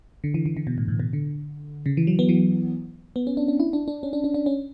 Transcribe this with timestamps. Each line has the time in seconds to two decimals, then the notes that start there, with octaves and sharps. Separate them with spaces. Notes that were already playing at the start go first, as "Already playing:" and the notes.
0.24 D3
0.34 E3
0.46 E3
0.57 D3
0.67 B2
0.78 A2
0.88 A2
1.00 B2
1.13 D3
1.86 C#3
1.97 E3
2.07 F#3
2.19 B3
2.29 E3
3.16 B3
3.27 C#4
3.37 D4
3.48 D4
3.60 E4
3.73 D4
3.88 D4
4.03 C#4
4.13 D4
4.24 D4
4.34 D4
4.46 C#4